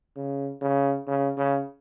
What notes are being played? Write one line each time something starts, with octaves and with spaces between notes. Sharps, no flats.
C#3
C#3
C#3
C#3